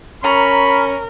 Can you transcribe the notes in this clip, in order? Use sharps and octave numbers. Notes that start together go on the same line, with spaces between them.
C#4 A#4 A#5 B5 C#6